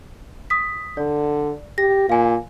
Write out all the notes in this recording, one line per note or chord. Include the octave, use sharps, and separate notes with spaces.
D#6 B6
D3 D5
G4 A#6
A#2 F5 G#5